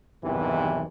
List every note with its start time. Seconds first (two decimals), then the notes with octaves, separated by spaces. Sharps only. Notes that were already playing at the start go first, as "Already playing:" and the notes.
0.22 B1 E2 G2 C3 D#3 E3